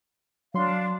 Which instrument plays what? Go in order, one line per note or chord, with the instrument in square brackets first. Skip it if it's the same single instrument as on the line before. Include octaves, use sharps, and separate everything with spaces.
[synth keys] F#3 C6 [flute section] D4 F5